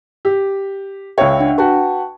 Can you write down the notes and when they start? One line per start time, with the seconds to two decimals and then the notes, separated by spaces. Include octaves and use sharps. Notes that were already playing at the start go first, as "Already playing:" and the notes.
0.25 G4
1.18 C#2 C#5 E5 F5 G5
1.39 D4 F#5
1.58 F#4 B4 G5 A5 C#6